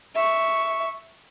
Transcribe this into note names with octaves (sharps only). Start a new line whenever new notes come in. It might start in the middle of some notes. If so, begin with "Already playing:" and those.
E5 C#6